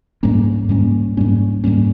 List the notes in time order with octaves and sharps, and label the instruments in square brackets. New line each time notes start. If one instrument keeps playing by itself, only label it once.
[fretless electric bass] G#2 G3 A#3 C#4
G#2 G3 A#3 C#4
G#2 G3 A#3 C#4
G#2 G3 A#3 C#4